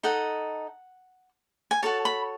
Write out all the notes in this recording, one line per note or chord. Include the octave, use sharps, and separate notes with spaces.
D#4 A4 D#5 F#5
G#5
F#4 A4 C#5 A5
B5